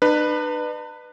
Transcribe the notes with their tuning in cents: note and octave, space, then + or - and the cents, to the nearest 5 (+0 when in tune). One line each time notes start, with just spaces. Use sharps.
D4 +45 B4 +0